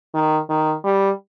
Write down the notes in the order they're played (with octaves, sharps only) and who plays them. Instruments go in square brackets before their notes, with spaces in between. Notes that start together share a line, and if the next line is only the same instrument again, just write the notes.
[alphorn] D#3
D#3
G3